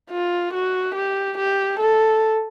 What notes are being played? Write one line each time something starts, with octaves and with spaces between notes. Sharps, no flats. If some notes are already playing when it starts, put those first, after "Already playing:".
F4
F#4
G4
G4
A4